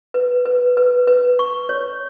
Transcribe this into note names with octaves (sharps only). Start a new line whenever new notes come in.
B4
B4
B4
B4
C#6
C#5